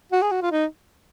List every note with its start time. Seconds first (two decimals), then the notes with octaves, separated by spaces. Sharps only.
0.12 F#4
0.22 G#4
0.32 F#4
0.42 F4
0.52 D#4